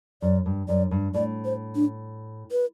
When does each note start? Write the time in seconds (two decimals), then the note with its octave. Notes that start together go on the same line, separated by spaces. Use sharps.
0.22 F#2 D5
0.46 G2
0.68 F#2 D5
0.91 G2
1.14 A2 D5
1.45 C5
1.75 D4
2.51 B4